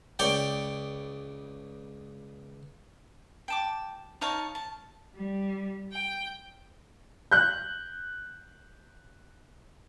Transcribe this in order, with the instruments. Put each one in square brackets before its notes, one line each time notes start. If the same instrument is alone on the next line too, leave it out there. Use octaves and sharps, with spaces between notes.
[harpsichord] C#2 C#5 D5 G5
[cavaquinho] G5 A5 D6
D#4 C#5 F5 A5
A5
[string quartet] G3
G5
[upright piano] F#6 G6